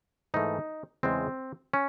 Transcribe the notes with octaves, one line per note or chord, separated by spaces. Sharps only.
G#2 E3 A3 D#4
E2 C#3 G#3 C4
C#4